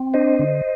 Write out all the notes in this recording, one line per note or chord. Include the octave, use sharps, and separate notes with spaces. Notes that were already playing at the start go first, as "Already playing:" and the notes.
Already playing: C4
D4 C5 D#5
D3